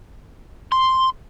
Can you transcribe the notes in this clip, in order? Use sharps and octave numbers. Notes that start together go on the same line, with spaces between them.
C6